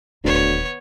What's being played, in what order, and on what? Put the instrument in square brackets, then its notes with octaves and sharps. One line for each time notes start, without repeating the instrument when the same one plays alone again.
[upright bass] D#1 D#3 [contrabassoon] D2 [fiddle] B3 C#5